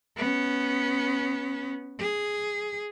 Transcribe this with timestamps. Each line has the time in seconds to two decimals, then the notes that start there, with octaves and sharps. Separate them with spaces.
0.17 B3 C#4
2.00 G#4